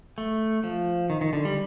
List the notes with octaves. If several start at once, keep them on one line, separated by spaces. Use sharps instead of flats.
A3
F3
D#3
D#3
D3
G3